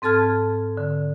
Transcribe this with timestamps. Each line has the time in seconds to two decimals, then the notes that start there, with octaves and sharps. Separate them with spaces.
0.02 G#2 C4 A4 A5 F6 G#6
0.77 D3